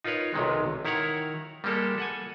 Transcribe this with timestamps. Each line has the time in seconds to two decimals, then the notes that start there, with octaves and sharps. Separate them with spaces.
0.04 D#4 F4 A#4 B4 C#5
0.34 B1 C3 D#3 G#3
0.85 D#3 E4 C#5 F#5 A#5
1.64 G3 G#3 A#3 G4 A4
1.98 A4 F#5 G#5